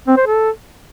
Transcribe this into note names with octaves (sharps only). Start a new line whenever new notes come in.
C4
C5
A4